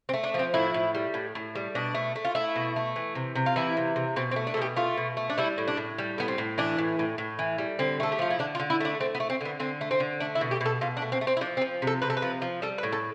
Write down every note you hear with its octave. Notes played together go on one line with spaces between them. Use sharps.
C4
A3
D4
F3
C4
A2 E4
A2
G3
A2
A2
G3
B2 D4
A3
A3
F4
A3 E4
B2
A3
E3
C3
C3
F4
E3 E4
C3
C3
B2 C4
C4
A3
D4
A4
B2 G4
A3 F4
B2
A3
D4
G3 E4
A2
D4
A2
G3
A2 B3
C4
A2
E3 D4
A2
A2
A2
E3
G3
D3 C4
A3 A4
G4
F3 F4
E4
D3 D4
F4
D3
E4
A3 D4
A3 C4
B3
A3
C4
D3 B3
D3 C4
A3
C4
D3
A3 D4
E4
B2
G4
B2 A4
B2 F4
D4
A3
C4
A3
C4
E4
F3 D4
C4
F3
C3
A4
C3 B4
A4
B4
F3
F3
G3 A4
B4
A2
A4